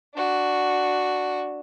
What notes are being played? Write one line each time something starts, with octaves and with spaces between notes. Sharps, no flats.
D4 F#4